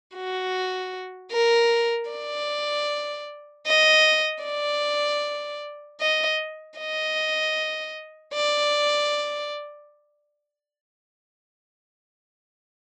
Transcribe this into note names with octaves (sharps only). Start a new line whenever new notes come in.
F#4
A#4
D5
D#5
D5
D#5
D#5
D5